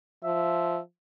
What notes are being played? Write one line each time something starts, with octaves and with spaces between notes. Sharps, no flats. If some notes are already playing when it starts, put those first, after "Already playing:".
F3 E5